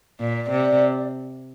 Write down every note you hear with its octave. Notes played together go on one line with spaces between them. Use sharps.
A#2 D5
D5
C3